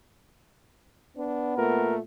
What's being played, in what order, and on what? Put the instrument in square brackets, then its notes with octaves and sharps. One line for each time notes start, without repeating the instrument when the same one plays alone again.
[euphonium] B3 [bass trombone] D4
[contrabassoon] A#2 [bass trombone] A3 [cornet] A#4